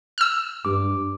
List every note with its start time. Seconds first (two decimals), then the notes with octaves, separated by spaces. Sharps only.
0.18 E6 F6
0.65 G2 D6